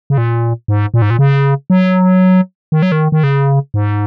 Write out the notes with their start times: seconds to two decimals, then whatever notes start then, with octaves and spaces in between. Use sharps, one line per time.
0.10 C#3
0.18 A#2
0.68 G#2
0.94 A#2
1.02 G#2
1.10 A#2
1.19 C#3
1.70 F#3
2.72 D#3
2.82 F#3
2.92 D#3
3.12 D#3
3.24 C#3
3.74 G#2